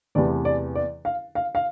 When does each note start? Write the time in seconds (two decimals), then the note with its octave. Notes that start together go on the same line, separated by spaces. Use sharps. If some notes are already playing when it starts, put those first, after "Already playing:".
0.15 E2 C3 E3 A3 D5
0.45 D5
0.75 D5
1.05 F5
1.35 F5
1.55 F5